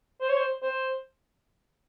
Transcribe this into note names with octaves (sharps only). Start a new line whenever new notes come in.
C5
C#5
C5
C5